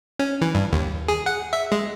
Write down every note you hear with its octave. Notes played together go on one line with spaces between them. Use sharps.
C#4
E3
G2
D#2
G#4
F#5
E5
G#3